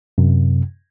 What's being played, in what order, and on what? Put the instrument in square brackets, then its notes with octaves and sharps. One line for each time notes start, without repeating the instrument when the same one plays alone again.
[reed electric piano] F#2 C3